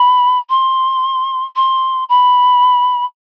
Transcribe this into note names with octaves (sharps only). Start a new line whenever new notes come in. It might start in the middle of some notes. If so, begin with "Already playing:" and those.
Already playing: B5
C6
C6
B5